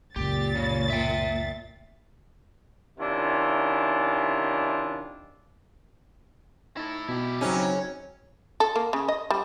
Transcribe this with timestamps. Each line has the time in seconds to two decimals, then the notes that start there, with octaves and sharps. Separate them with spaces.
0.16 C#2 F#2 A#2 G4 A6
0.56 C#3
0.90 E5 G5
2.99 C3 D#3 C#4 D4 E4 F4
6.77 D#4 E4 A4
7.09 B2 E4 G4
7.41 C#3 F#3 C4 C#4 D#4
8.60 A4
8.76 A#3
8.93 C#3
9.09 D#5
9.30 G3